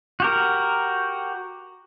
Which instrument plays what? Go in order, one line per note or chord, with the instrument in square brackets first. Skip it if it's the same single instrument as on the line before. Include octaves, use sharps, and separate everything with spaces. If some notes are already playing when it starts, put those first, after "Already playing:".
[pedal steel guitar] F#4 G4 A#4